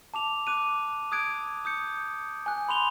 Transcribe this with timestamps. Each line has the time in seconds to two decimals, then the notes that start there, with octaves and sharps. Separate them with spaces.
0.14 A5 D6 F7
0.47 D6 F#6 D#7
1.12 D#6 F#6 G#6 D7
1.65 D#6 G6 C#7
2.46 G#5 F#6
2.68 B5 C6 F7 G7